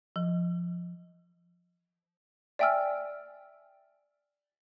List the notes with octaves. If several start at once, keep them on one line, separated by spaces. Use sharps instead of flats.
F3
D5 E5 G5 G#5 E6 F6